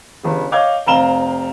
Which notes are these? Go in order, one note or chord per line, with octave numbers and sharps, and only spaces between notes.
G1 C#3
C#5 D#5 F5 D6 G6 G#6
F1 C4 F5 A#5 E7 G7